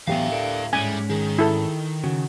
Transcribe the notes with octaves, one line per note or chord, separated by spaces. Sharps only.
D2 A2 E3 F#3 B3 G4 B4 F5
A4 A#4 D5
G#2 G3 G#3 C#4 G#5
D#3 G#4
E4 A4
C#3 F#4